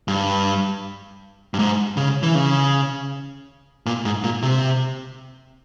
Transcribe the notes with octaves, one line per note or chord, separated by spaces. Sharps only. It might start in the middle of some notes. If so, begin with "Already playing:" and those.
G2
G2
G#2
C#3
E3
C#3
A#2
G#2
A#2
C3